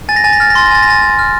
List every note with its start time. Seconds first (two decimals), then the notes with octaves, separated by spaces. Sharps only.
0.09 G#5 A6
0.16 A#6
0.24 G#5 A6
0.33 A#6
0.40 F6 A6
0.50 A#6
0.55 C6 A6
0.66 A#6
0.71 G#5 A6
0.83 A#6
0.87 G#5 A6
1.02 G#5
1.19 F6